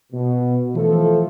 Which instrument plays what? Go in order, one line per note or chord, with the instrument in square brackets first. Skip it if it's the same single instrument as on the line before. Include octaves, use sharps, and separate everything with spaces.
[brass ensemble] B2
E3 F3 A3 A4